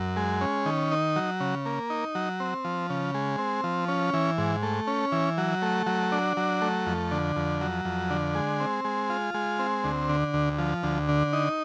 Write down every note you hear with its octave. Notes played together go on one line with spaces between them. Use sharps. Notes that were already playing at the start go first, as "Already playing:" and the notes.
Already playing: F#2
G#3
C#4
D#3
D#4
F#3
C#3
A#3
D#4
F#3
C4
F3
C#3
G#3
C4
F3
C#4
E3
G#2
A3
C#4
E3
F#3
A3
F#3
D4
F#3
A3
F2
D3
F2
F#3
F2
D3
G#3
C4
G#3
F4
G#3
C4
D2
D3
D2
F3
D2
D3
D#4